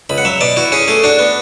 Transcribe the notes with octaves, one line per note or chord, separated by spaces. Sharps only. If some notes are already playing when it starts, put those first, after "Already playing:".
C#2 B5
F#5
F#3 E5
B2 D5
E4 F#4
C#4 G#4
A3 G#4
D4 F#4
B3